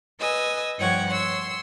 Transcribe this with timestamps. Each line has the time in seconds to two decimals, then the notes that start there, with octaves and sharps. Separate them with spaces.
0.19 B4 D#5 G#5 E6
0.77 G2 F3 C#5 F#5 G5 G#6
1.09 C#5 C6 E6